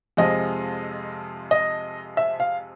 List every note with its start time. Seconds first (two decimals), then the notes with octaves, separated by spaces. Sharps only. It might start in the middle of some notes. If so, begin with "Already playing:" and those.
0.17 F2 C3 F3 G#3 D#5
1.51 D#5
2.17 E5
2.40 F5